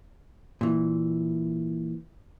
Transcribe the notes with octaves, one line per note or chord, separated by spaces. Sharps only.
A#2 E3